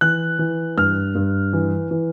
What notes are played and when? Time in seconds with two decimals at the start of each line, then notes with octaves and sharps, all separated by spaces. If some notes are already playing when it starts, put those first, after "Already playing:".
0.01 E3 F#6
0.39 E3
0.77 G2 F6
1.15 G2
1.53 E3
1.91 E3